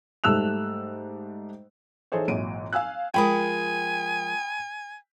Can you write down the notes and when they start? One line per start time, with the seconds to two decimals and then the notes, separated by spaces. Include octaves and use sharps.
0.24 G#2 G3 A3 E6 F#6 F7
2.12 E3 D#4 G#4 A4 C5 C#5
2.28 G#1 A#2 E3 F#3 D7 D#7
2.73 F5 G#5 E6 F#6
3.14 F3 G#3 A#4 G5 G#5 B5 D#6